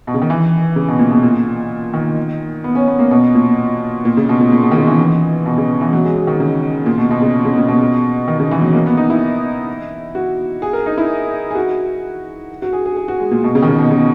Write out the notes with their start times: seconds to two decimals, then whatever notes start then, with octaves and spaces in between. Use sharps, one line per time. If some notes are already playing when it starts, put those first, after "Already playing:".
0.07 B2
0.14 C#3
0.22 D#3
0.30 E3
0.76 C#3
0.88 B2
0.99 A#2
1.11 B2
1.23 A#2
1.93 D#3
2.64 B3
2.75 C#4
2.88 B3
2.99 A#3
3.11 B2
3.35 A#2
4.05 A#2
4.17 C#3
4.29 B2
4.41 A#2
4.52 A#2
4.63 B2
4.71 D#3
4.76 C#3
4.87 E3
4.99 E3
5.46 B2
5.58 C#3
5.81 E3
5.93 F#3
6.05 G#3
6.16 G#3
6.27 D#3
6.40 C#3
6.86 A#2
6.98 B2
7.11 B2
7.22 C#3
7.45 C#3
7.57 A#2
7.68 B2
8.28 D#3
8.40 C#3
8.51 E3
8.62 F#3
8.74 A#3
8.86 B3
8.97 D#4
9.10 E4
10.15 F#4
10.62 G#4
10.73 A#4
10.86 D#4
10.98 E4
11.51 G#4
11.55 F#4
12.62 F#4
12.73 G#4
12.86 G#4
12.97 G#4
13.08 F#4
13.20 G#3
13.31 A#2
13.44 B2
13.55 C#3
13.62 D#3
13.68 C#3
13.78 B2
13.90 C#3